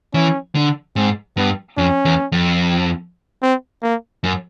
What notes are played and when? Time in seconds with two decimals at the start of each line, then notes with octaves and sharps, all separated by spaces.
0.14 E3 C#4
0.55 D3
0.96 G#2 C4
1.37 G2 B3
1.77 F2 C#4
2.05 E2
2.32 F2
3.42 C4
3.83 A#3
4.24 F#2